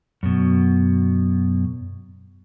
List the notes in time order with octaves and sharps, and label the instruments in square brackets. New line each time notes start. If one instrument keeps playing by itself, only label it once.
[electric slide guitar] F#2 B2